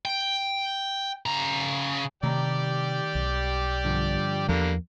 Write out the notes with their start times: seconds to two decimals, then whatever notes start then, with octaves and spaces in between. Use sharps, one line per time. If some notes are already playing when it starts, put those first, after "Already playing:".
0.05 G5
1.26 C#3 A#5
2.23 C3 D#3 A3 G4 D5 G5 A#5
3.15 B1
3.84 G2 D3 F3
4.48 E2 D3 F3 G3 A#3